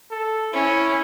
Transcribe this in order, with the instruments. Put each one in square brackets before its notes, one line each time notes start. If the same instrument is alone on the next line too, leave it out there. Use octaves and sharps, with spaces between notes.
[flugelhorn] A4
[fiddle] C#4 [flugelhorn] E4